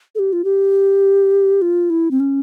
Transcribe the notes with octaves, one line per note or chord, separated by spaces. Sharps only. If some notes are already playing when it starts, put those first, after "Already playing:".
A4
G4
F4
G4
F4
E4
C4
C#4